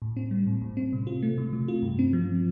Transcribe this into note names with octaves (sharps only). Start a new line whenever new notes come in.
A2
C4
G3
A2
A2
C4
C3
F4
A3
C3
C3
F4
G2
C4
F3